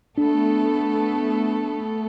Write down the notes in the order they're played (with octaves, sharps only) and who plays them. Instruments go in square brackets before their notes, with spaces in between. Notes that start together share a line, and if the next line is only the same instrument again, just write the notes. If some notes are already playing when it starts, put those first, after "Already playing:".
[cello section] A3 B3 A4 [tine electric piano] D4